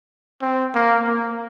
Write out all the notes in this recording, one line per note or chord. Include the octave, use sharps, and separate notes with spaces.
C4
A#3
A#3